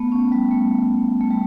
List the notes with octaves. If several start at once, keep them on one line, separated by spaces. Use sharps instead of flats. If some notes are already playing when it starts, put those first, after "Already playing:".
Already playing: A3 B3
C#4
G3
A3
A3
G3